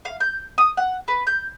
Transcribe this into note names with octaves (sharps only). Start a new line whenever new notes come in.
F5
G6
D#6
F#5
B4
G6